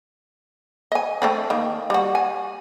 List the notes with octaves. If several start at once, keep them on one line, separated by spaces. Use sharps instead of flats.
D#5 G#5
A3 C4 D4
D#3 A#3
G3 F#4
G#5